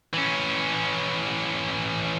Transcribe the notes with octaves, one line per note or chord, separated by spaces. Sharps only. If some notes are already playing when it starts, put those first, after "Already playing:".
E3 C#4